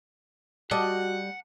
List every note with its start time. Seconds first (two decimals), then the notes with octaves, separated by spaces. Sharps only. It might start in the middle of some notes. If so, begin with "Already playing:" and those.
0.71 G3 F#4 D#5 F#5 A5 D6